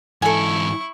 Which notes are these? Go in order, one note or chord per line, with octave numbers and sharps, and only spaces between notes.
G#2 E3 E4 A4 G#5 C#6